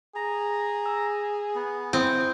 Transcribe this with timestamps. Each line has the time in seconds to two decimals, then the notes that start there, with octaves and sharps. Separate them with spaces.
0.16 G#4 A#5
0.85 G#5 E6
1.55 B3
1.93 C4 E4 D#6 G6